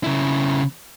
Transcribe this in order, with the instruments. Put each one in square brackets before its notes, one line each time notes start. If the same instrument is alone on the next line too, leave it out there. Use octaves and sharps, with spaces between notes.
[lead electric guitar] C#3 E4